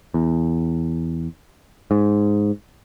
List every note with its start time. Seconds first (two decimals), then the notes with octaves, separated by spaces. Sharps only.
0.14 E2
1.91 G#2